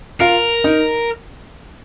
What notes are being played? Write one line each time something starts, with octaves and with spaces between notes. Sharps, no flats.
F4 A#4 F5
D#4 D#5